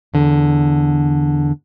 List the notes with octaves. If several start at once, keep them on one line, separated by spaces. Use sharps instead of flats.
E2 D3